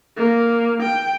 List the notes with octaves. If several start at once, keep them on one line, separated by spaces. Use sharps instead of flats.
A#3
G5